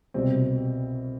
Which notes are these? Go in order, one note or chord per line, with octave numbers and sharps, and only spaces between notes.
C2 B2 G3 C4